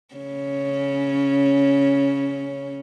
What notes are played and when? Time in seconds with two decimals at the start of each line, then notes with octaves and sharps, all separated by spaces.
0.15 C#3 C#4